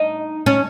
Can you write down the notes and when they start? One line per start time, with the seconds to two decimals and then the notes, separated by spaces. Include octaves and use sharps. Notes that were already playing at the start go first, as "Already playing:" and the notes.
Already playing: D#4
0.46 C#4